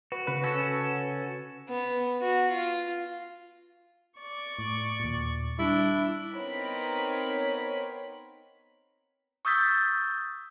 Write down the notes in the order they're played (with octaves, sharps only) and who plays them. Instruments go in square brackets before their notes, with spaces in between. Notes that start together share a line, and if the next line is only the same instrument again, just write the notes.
[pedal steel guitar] F#4 [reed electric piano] B4
[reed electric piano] C#3 B4
[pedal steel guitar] C#4 F#4 A4
[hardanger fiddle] B3
F#4
F4
[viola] D5 C#6
[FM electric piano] A2
D#2 A#2
[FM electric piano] G3 [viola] D4 [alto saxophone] E4
[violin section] B3 C4 D#4 A#4 C#5 B5
[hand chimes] C#6 D#6 E6 G6 A6 B6